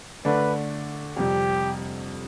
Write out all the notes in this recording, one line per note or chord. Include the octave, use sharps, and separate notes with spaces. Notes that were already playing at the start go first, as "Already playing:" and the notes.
D3 A3 D4 B4
F2 C3 G3 G4